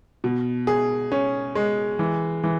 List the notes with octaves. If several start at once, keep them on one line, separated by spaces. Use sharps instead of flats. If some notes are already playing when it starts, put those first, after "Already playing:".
B2
G#4
C#4
G#3
E3
E3